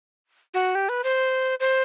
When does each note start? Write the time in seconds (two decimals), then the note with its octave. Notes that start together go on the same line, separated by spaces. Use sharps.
0.54 F#4
0.75 G4
0.89 B4
1.04 C5
1.60 C5